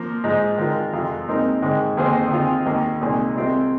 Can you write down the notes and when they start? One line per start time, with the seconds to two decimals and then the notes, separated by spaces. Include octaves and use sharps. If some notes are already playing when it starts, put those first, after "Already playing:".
Already playing: F3 A#3
0.24 G#2 F3 G#3 D#4
0.58 D#3 G#3 F4 A#4
0.93 F2 C3 G#3 F4
1.28 A#2 G#3 C4 D#4 A#4
1.62 G#2 D#3 G#3 D#4
1.97 F2 D#3 A#3 G#4 C5
2.31 D#3 C4 F4 G#4
2.66 D#2 D#3 A#3
3.01 C2 A#2 G#3 D#4 G#4
3.35 C2 C3 G#3 C4 F4